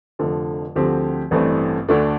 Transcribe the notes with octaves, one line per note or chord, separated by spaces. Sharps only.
F1 F2 D3 F3
D2 D3 F3 C4 G4
A1 G2 E3 A3 C4
D2 D3 A3 D4